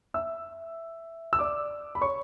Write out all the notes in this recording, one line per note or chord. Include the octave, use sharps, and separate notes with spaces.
E5 E6
E6
D5 D6
B5
C#5 C#6